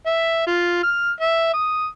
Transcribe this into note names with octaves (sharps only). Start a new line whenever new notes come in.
E5
F4
F6
E5
D#6